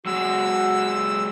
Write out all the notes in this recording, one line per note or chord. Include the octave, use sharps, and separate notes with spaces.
F#3 G#3 F#4 G#4 E6